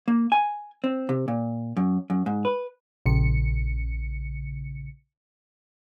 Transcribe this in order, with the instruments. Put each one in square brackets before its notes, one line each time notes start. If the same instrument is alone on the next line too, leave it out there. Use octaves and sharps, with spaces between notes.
[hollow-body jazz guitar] A#3
G#5
C4
C3
A#2
F#2
F#2
G#2
B4
[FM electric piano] A#1 C#3 C#7